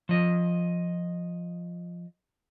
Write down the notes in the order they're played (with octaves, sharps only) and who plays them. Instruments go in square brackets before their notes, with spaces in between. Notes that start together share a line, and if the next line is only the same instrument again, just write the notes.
[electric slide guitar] F3 D#5